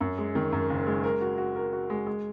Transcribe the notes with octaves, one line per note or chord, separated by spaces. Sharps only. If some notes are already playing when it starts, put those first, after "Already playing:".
F#2
G#3
D#3
F#2
F#1
G#3
A#4
F#4
F#4
A#4
F#4
G#3
G#3